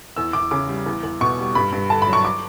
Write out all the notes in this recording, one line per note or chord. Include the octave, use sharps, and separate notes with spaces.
E2 E6
E2 D6
C#3 D6
G3
E2
E2
B2 C#6
G3
G2 B5
G2
D3 A5
B5
F#3
C#6
D6